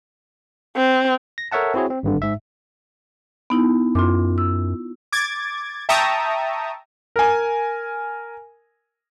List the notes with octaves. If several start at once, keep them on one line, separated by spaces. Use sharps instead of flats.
C4
A#6
A4 A#4 C#5 E5 F#5 A5
C4 E4 F#4 G#4 C#5
C4
G#1 G2 D3
G#2 E5
B3 D#4 E4
F#2 F4 C6 D6
E6
D6 G#6 A6
E5 G5 A5 A#5 C#6 D#6
A#4 G#5